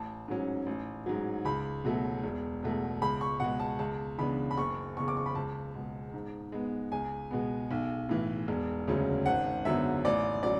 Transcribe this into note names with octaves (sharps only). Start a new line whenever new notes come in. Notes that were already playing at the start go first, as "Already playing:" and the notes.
Already playing: A1 A5
G#2 F#3 C#4
A1
G#2 F#3
C#2 B5
B2 F#3 A3
E1
E2 B2 A3
C#2 B5
C#6
B2 G#3 F#5
A5
C#2 A5
C#3 E3 B3 D4 B5
B5
F#1 C#6
E2 C#3 C#6
D6
C#6
B5
C#2 A5
B2 G#3
G#2
G#3 B3
C#2 G#5
B2 G#3 B3
B1
A2 E3
E1
D2 C#3 F#3 C#4
G#1 F#5
F#2 D3 F#3 B3 E5
A1 D5
F#3 C#4 D5